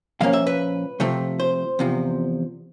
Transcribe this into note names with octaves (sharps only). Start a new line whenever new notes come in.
A#2 F3 A#3 C#4 F5
E5
B4
C3 F3 A3 C4
C5
E2 C3 F3